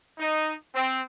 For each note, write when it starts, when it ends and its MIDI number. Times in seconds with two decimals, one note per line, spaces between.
0.19 0.54 63
0.74 1.00 60